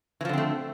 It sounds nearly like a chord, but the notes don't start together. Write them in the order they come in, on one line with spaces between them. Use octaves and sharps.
E3 F3 D3 C4 A3